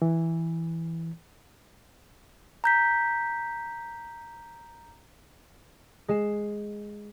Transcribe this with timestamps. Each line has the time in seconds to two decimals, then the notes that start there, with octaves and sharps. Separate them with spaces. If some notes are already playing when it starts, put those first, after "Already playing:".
0.02 E3
2.64 A#5 G6 B6
6.08 G#3 C7 E7